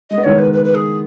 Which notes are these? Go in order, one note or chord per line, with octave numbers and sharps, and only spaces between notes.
G#3 D#5
B3
D#3 G#3 C#5
B4
B4
B4
G#4